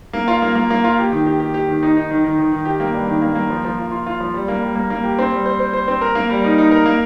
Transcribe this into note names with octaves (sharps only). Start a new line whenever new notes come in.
A#3
F4
A#3
A#3
A#3
F4
G4
D#3
G4
G4
G4
D#3
D#4
D#4
D#3
D#3
D#3
D#3
G4
A#3
G2
D#3
A#3
A#3
F3
F3
F4
F4
F4
F3
G3
A#3
G3
A#3
A#3
G4
C4
G3
C5
C5
C5
C4
A#4
A#3
G3
D#4
D#4
A#4
A#3